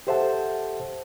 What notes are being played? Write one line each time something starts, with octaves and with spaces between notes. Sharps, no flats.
G4 A4 C5 E5 F#5 A5